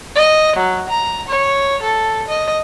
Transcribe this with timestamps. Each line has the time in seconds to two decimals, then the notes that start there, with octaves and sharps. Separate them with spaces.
0.16 D#5
0.56 F#3
0.89 A#5
1.28 C#5
1.82 A4
2.28 D#5